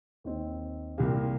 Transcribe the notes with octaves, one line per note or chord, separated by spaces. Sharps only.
D#2 D#3 C4
C2 A#2 A#3 G4